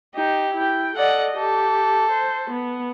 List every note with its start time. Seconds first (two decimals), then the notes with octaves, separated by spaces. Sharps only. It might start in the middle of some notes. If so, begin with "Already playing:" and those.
0.15 D#4 G4
0.54 E4 G5
0.96 A4 D5 D#5 F#5
1.37 G4 A4
2.10 C5
2.50 B3